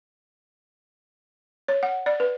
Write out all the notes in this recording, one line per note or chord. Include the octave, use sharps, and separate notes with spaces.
C#5
F#5
D5
B4